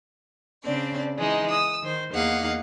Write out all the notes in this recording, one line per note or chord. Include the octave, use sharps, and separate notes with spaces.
C#3 C4 D4 D5
E3 G#3 D#4
D#6 E6
D#3 C5
E2 A#3 D#4 G#4 F5 F#5